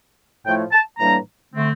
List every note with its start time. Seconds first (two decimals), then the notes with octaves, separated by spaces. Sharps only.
0.45 A2 F3 A3 E4 G5
0.72 A5
0.99 A2 E3 G3 A#3 D4 A#5
1.54 D3 A3 C4